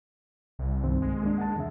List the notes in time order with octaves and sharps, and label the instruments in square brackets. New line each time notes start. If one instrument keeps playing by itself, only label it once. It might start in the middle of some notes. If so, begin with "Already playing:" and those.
[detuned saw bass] C2
[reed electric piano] G2 D#3 C4
[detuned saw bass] G#3
[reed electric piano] A#3 D4
F#5 A5
E2 C#3 E5